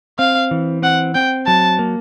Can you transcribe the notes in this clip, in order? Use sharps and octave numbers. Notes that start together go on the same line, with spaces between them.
C4 F5
E3
C4 F#5
C4 G5
F#3 A5
A#3